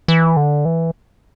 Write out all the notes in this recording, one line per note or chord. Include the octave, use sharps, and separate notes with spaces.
E3
D3
E3